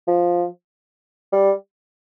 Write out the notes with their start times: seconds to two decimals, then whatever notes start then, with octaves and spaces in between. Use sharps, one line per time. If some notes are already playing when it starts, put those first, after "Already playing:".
0.07 F3
1.32 G3